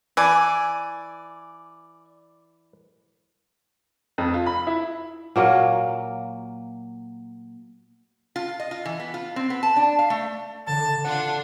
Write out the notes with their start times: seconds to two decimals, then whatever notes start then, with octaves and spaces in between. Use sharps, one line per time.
0.17 E3 D5 G#5
4.18 F2
4.34 F4
4.46 B5
4.67 E4
5.36 A#2 F#3 A#3
8.36 F4
8.60 D#5
8.71 F4
8.85 E3
9.00 B3
9.14 F4
9.36 C4
9.50 B3
9.63 A5
9.76 D4
9.99 F5
10.10 A3
10.67 A1 D3 D5 A5
11.04 D4 F4 F#5